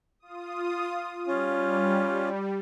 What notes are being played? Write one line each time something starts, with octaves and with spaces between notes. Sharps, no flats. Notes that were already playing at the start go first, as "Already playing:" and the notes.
F4 D#6
G3 C#4 F4